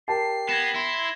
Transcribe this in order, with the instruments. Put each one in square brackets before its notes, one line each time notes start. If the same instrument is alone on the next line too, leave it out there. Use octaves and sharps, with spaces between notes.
[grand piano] G4 A#4 A5 [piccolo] C7
[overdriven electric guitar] B3 [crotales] G#6 A#6 E7
[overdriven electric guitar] E4 [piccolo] C6